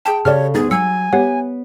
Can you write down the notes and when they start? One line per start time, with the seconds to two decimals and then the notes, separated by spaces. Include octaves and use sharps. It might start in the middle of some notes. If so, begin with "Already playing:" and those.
0.06 G#4 G5 A5
0.25 C#3 G4 A4 C#5 D5 F6
0.54 D2 B3 D#4 G#4 A6
0.71 F#3 G#5 E6 C#7
1.13 B3 G4 C#5 F#5